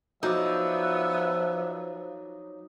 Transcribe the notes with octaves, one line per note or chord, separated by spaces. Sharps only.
F3 F#3 B3 D#4 D5 E5